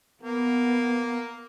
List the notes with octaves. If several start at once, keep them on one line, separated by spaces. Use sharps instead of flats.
A#3 B3